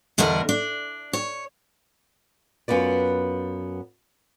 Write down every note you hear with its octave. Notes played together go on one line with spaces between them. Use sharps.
E2 D3 G3 A#4 D#5
D4
C#5
F#2 B3 F4 B4 D5